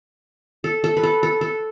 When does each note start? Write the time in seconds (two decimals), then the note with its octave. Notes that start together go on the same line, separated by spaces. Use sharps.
0.64 A4
0.84 A4
0.97 B4
1.03 A4
1.23 A4
1.41 A4